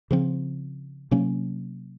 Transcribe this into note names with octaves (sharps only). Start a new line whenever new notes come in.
C#3 F3 C4
C3 F#3 A#3 C#4